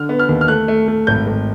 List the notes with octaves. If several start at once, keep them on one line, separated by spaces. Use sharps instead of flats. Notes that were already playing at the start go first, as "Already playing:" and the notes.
Already playing: D3 F6
B3
F6
D#2
F6
A3 F#6
A3
A3
G#1 G6
G#1